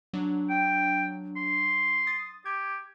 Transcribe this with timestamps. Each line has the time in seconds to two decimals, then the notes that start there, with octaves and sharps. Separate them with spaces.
0.13 F#3 D4
0.50 G5
1.37 C6
2.07 D#6 A6
2.46 G4 G#6